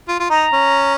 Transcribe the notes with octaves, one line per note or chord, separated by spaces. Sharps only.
F4
F4
D#4 A#5
C#4